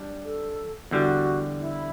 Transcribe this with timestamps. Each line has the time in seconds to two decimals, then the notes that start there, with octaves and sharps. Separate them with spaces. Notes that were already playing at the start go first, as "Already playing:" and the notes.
Already playing: G3 D4
0.24 A4
0.91 E2 D3 G3 F#4
1.59 E4